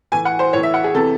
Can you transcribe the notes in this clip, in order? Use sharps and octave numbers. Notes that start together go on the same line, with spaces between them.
A2 E3 G#5
F#5
C5
A2 E3 C#5
E5
F#5
G#4
C3 E3 A4